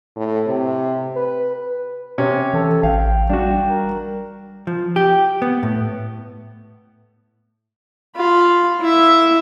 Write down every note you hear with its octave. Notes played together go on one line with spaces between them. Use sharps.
A2
C3
B4
C3 C#4
E3 A4
A1 F5 G5
G3 D4 F#4
A#4
F3
G4
B3
A2
F4 B5
E4 E5